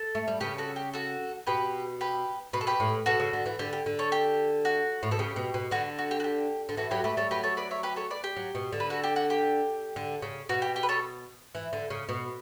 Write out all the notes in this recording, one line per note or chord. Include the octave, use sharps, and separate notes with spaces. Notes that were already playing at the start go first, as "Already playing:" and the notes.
Already playing: A4
A3
G3
C#3 G4 B4
F#4 A4
G4
F#4 A4
B2 G4 B4
G4 B4
B2 B4
A4
G4 B4
A2
B2 F#4 A4
C#3
D3
E3
D3 G4
G4
D3
A4 C#5
G4
F#4
A2
B2 A4
C#3 G4
B2
B2
D3 F#4
F#4
G4
F#4
G4
D3
E3 F#4 A4
F#3 G4 B4
A3 G4 B4
G3 A4 C#5
F#3 G4 B4
A4 C#5
B4 D5
C#5 E5
G4 B4
A4 C#5
B4 D5
G4
F#3
B2
D3
B4
F#4 A4
G4
F#4
G4
D3
C#3
B2 F#4
G4
G4
B4
A4 C#5
E3
D3
C#3
B2